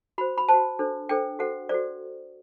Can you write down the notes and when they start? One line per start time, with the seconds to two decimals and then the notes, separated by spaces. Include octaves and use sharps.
0.18 F#4 C5 B5
0.38 B5
0.49 F#4 C5 A5
0.79 D4 A4 C5
1.09 D4 A4 C5 G5
1.39 F#4 A4 C5 F#5
1.69 F#4 A4 C5 D5